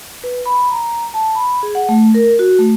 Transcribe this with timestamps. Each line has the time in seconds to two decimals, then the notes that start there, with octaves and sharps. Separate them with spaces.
0.24 B4
0.46 B5
0.72 A#5
1.14 A5
1.35 B5
1.63 G#4
1.75 F#5
1.89 A3
2.15 A#4
2.39 F#4
2.59 A3